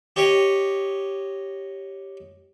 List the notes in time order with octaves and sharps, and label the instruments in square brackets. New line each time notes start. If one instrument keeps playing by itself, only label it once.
[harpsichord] G4 C#5 D#5